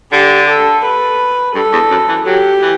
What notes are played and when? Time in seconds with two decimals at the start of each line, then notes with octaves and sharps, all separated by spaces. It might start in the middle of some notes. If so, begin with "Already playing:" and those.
0.12 D3 G4
0.48 A4
0.84 B4
1.55 G2 A4
1.73 E2
1.90 F#2
2.08 E3
2.26 F#3 G4
2.62 E3